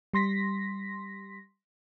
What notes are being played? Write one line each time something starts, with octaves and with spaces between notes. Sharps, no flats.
G3 C6 A#6 B6